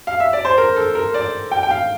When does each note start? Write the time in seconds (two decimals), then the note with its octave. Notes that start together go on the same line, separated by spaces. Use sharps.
0.07 F5
0.20 E5
0.33 D5
0.45 C5
0.58 A#4
0.76 A4
0.95 A#4
1.14 D5
1.51 G5
1.63 G5
1.71 F5